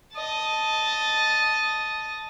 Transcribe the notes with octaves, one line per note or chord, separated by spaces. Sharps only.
D#5 A5